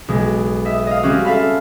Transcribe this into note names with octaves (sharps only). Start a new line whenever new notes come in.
B1 G#3
D#5 E5
D#5 F5
G3 G#3 C4 C#4 F#4
A4 E5 F5 A5 B5